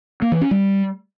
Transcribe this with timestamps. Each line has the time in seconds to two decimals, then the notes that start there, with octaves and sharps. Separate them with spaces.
0.22 A#3
0.32 E3
0.41 C#4
0.51 G3